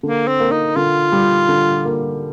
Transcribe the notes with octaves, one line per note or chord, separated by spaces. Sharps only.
D3 A#3
C4
A#3
D#4
D3 F4
G3
D3
A#3